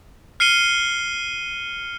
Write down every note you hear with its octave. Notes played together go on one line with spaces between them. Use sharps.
F6 C7 C#7 D#7 G7